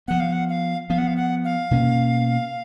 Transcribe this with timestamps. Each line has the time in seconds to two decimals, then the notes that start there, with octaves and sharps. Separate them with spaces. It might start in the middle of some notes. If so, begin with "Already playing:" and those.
0.08 F3 B3 F#5
0.20 F5
0.33 F#5
0.49 F5
0.90 F3 B3 F5
0.98 F#5
1.07 F5
1.16 F#5
1.44 F5
1.71 B2 A#3 C#4